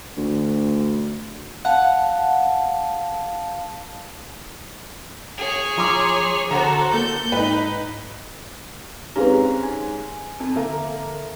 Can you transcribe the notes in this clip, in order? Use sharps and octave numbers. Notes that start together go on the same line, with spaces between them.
D2
F5 F#5 A5
G#4 C#5
F3 A#5 C6 D6
D3 F#4 A4 C5 F#5 A#5
A#3 A4 G6
G#2 D#4 B4
G#2 C4 C#4 G4 G#4 B4 F5 A#5
G#5
F2
D3 A#3 A4 A#4 E5